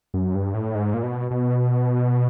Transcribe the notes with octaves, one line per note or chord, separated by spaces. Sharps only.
F#2
G2
A2
G#2
A#2
B2
B2